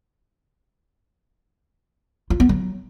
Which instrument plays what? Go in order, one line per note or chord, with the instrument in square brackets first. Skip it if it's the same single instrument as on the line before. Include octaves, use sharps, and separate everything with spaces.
[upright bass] F4
B3
F#3